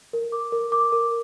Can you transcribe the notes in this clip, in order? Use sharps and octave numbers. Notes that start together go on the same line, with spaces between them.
A#4
D6
A#4
D6
A#4